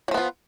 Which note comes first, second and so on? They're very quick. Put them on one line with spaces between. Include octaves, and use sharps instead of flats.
F#3 F3 B3 F4